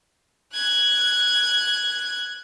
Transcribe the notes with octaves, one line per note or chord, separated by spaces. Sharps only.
F#6 G#6